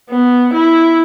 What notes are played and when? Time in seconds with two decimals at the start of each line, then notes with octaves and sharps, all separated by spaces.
0.10 B3
0.54 E4